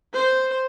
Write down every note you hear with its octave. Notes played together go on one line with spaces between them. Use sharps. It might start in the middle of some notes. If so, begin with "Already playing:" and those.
C5